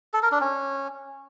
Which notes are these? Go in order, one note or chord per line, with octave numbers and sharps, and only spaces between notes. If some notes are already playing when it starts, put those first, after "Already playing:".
A4
A#4
D4
C#4